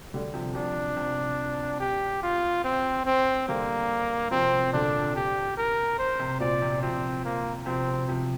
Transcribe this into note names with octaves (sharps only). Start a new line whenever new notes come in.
D3 G3
C3 F3
C3 F3 D4
C3
G4
F4
C4
C4
D3 G3 A#3
C3 F3 C4
A#2 D3 D4
G4
A#4
C5
C3
A#2 D5
C3
C3 F3 C4
A#3
C3 F3 C4
C3
C3 F3